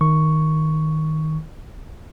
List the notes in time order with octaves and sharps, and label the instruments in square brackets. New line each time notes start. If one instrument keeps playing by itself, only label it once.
[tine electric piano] D#3 C#6